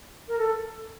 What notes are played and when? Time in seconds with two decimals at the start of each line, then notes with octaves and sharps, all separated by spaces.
0.28 A#4
0.38 A4